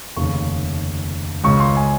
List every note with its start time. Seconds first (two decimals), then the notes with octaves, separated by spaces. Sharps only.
0.16 F1 D#2 C#3 C#6
1.44 C#2 C#3 C#6
1.60 C6
1.77 G#5